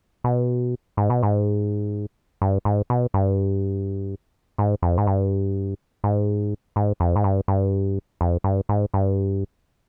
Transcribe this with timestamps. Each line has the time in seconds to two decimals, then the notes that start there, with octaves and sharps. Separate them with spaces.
0.24 B2
0.97 G#2
1.10 B2
1.23 G#2
2.42 G2
2.65 G#2
2.90 B2
3.14 G2
4.58 G#2
4.82 F2
4.98 G#2
5.07 G2
6.04 G#2
6.76 G#2
7.00 F2
7.16 G#2
7.24 G2
7.48 G2
8.21 F2
8.44 G2
8.69 G#2
8.94 G2